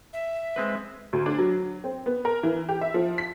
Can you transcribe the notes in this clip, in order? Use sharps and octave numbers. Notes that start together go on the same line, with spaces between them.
E5
G#3 C4 B4
D2
D4
F#3
C4
B3
A#4
E3
G4
E5
F3
B6